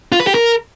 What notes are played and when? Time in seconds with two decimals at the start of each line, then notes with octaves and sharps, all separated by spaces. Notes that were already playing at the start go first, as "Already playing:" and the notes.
0.12 F4
0.20 B4
0.27 G4
0.34 A#4